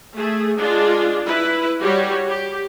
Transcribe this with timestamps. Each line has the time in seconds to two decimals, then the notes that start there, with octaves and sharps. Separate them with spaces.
0.16 A3 G#4
0.59 G#3 D4 F4
1.27 E4 B4
1.81 G3 F#4 G4 C#5
2.29 G4